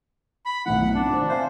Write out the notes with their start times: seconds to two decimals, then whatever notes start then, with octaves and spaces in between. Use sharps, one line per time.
0.46 B5
0.66 B1 A2 D#3 F#5
0.94 C3 C4 D4
1.10 D#3 C5
1.29 C5 E5 F5 G#5